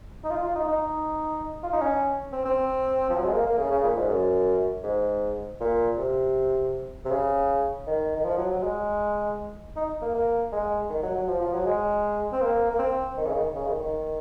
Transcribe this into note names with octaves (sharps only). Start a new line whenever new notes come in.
D#4
F4
F4
D#4
D#4
F4
D#4
C#4
C4
C4
F3
F#3
G#3
A#3
A#3
C#3
C#3
A#2
G#2
F#2
G#2
A#2
C3
C3
C#3
D#3
D#3
F3
F#3
F#3
G#3
D#4
A#3
A#3
G#3
D#3
F#3
F#3
F3
F3
F#3
G#3
C4
A#3
A#3
C4
D#3
C#3
D#3
C#3
D#3
D#3